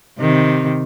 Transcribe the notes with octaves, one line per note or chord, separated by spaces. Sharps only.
C3 D#3